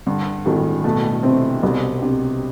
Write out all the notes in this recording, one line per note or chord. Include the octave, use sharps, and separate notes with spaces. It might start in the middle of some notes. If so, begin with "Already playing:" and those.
G2 D3
G#1 A2
B2 A3
C3 C4
C2 B2
C3